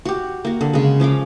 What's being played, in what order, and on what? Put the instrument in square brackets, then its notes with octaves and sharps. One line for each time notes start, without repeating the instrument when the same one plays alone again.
[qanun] F#4 G4
A#3 F#4
D3
C#3 G#3
F3 C#4 F5 D6